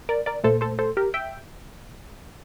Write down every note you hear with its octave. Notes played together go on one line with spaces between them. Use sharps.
A#4 D5
A#4 D5
A#2 A3 A4 C5
A4 C5
A4 C5
G4 A#4
E5 G5